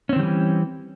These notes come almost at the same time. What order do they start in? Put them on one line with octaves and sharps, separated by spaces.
C#4 C4 D#3 G3 E3